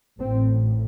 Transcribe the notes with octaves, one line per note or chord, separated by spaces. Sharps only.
A1 A2 C4